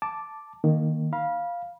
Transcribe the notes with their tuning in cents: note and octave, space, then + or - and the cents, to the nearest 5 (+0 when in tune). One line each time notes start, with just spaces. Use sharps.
A5 +0 D6 +0
D#3 +0 A#3 +0
F5 +0 B5 -30